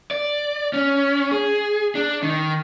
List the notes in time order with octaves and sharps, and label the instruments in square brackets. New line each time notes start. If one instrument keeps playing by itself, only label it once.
[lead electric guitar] D5
C#4
G#4
D4
D#3